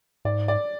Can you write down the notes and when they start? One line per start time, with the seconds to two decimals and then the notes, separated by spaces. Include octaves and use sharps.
0.25 G#2 D5
0.48 D5